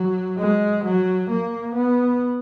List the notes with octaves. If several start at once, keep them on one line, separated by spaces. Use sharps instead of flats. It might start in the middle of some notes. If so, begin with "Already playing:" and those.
Already playing: F#3
G#3
F#3
A#3
B3